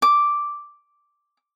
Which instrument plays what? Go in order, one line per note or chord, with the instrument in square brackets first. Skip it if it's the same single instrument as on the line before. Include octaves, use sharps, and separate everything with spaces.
[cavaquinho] D6